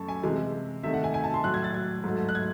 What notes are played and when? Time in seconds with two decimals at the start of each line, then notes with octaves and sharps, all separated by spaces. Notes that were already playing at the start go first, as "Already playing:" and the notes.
Already playing: F#2 A3 A5 C#6
0.08 G#5
0.24 C3 E3 G#3
0.83 C3 D#3 A3 E5
0.94 F#5
1.04 G#5
1.14 G#5
1.24 A5
1.34 C6
1.44 A2 F#3 A3 F#6
1.54 G#6
1.64 A6
1.74 G#6
2.04 G#2 F#3 A3
2.29 F#6
2.35 G#6